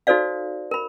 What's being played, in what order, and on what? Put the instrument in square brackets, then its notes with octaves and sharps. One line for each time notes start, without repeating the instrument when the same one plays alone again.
[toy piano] D#4 F#4 A4 C5 D5 F5
A#4 B5